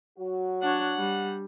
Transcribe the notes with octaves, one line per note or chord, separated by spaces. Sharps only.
F#3 F#4
D4 C#5 F#5
G3